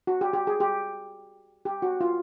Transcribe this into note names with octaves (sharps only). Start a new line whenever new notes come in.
F#4
G4
G4
G#4
G4
G4
F#4
F4